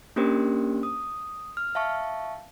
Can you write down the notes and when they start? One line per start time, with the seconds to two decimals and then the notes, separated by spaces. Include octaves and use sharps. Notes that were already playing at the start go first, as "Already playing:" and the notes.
0.16 A#3 C#4 D4 G4 A#4 C5
0.83 D#6
1.57 F6
1.75 E5 F5 A5 C#6